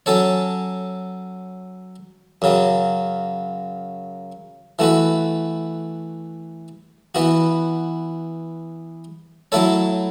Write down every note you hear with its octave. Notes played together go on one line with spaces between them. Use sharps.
F#3 C#4 A4 C#5
F#2 C#3 F#3
E3 A3 F#4 B4
E3 B3 F#4
F#3 A3 E4 A4 C#5